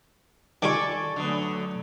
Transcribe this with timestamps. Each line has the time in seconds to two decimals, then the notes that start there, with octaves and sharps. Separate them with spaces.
0.62 D#3 G3 F4 A4 D5 G#5 C#6
1.16 D3 F#3 A3 B3